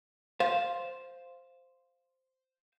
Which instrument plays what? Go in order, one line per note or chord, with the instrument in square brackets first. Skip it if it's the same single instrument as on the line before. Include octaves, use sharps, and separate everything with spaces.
[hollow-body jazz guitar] C5 F5